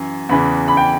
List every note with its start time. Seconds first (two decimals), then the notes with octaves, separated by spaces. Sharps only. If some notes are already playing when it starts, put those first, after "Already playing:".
Already playing: F#2 E3
0.29 E2 C#3 E3 B5
0.68 B5
0.77 G5